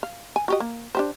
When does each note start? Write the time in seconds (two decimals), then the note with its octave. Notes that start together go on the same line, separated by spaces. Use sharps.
0.03 F5
0.36 G#5
0.48 F#4 G4 D#5
0.60 A#3
0.95 D4 G4 C5